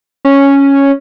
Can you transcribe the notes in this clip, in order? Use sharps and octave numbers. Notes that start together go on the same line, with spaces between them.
C#4